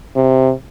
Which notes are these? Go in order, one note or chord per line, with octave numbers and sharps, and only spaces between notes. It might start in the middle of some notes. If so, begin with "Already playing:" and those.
C3